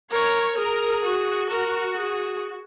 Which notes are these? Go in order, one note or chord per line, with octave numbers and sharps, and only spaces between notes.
A#4 C#5
G#4 A#4
F#4
A#4
G#4